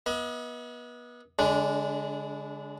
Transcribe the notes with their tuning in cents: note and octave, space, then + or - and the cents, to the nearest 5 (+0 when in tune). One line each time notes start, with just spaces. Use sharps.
B3 -30 D#5 +40
D3 -40 G#3 +0 D4 -10